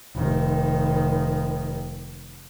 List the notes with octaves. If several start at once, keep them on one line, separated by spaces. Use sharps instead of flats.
F1 D#3